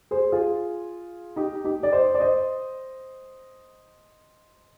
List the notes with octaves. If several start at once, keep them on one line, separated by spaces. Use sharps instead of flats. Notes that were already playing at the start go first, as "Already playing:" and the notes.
G#4 C5
F4 G#4
D#4 G4
D#4 G4
D5
C5 D#5
D5
C5 D#5